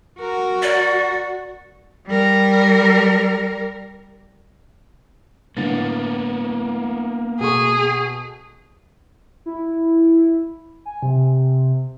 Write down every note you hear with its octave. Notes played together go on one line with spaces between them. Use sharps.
F#4 A#4
D5
G3 A#4
A2 D3 A#3 B3 A6
B2 G#4 A4 C#6
E4
G#5
C3